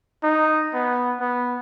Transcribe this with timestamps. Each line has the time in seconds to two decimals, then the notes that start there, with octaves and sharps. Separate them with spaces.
0.24 D#4
0.74 B3
1.20 B3